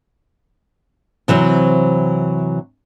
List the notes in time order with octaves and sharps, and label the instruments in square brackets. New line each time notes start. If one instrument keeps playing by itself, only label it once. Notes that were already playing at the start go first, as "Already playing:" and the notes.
[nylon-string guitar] C3 E3 F#3 C4